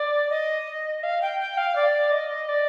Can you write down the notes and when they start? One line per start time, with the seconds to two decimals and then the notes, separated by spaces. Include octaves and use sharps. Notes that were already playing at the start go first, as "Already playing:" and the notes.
Already playing: D5
0.30 D#5
1.03 F5
1.22 G5
1.40 G5
1.57 F5
1.76 D5
2.12 D#5
2.49 D5